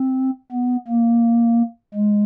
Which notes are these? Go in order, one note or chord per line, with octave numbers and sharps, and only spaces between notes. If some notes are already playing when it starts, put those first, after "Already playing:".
Already playing: C4
B3
A#3
G#3